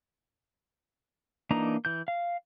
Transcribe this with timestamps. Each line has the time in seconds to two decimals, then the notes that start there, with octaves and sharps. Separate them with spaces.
1.51 E3 A#3 D4 D#4 A#5
1.85 E3 G6
2.08 F5